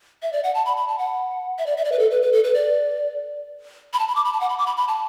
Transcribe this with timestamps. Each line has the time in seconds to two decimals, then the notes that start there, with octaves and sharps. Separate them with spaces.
0.22 E5
0.33 D5
0.44 F#5
0.55 A5
0.66 B5
0.77 B5
0.88 A5
0.99 F#5
1.58 E5
1.66 D5
1.77 E5
1.85 D5
1.92 B4
1.99 A4
2.11 B4
2.22 B4
2.33 A4
2.44 B4
2.54 D5
3.93 B5
3.99 A5
4.08 B5
4.16 D6
4.25 B5
4.33 A5
4.41 F#5
4.50 B5
4.58 D6
4.67 B5
4.77 B5
4.88 A5